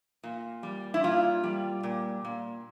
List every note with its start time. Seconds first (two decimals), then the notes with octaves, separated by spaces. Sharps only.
0.24 A#2
0.63 G3
0.94 E4
1.04 A#2 F4
1.43 G3
1.83 A#2
2.25 A#2